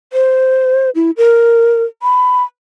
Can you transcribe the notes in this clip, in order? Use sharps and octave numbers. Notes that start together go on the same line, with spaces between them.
C5
E4
A#4
B5